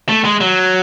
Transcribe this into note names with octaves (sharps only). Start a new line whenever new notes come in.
A3
G#3
F#3